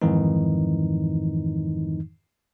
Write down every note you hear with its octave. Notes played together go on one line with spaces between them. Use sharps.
F2 G#2 D#3 E3 D#4